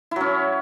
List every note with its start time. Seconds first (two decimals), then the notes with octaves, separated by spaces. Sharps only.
0.11 E4
0.16 F#3
0.21 C#4